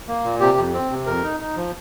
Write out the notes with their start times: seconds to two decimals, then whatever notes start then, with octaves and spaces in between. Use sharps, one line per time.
0.08 A#3
0.25 A#2
0.40 C3 G4
0.57 F2
0.74 C4
0.91 C3
1.07 F2 A#4
1.23 D#4
1.40 D#4
1.56 F3